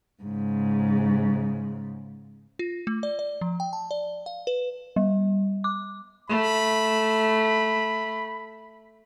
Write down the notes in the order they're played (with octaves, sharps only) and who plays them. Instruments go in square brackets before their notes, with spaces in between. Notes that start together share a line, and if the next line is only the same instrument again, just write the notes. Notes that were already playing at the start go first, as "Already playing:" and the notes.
[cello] G#2 C#3
[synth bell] F4
A3
D5
D5
F3
G5
A5
D5
F5
B4
G3
D6
[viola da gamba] A3 [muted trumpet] B5